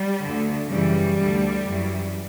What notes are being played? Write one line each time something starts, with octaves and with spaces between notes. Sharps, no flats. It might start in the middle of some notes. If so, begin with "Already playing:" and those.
Already playing: G3
D2 D3
F#2 C#3 E3 G3
D2 D3
F#2 E3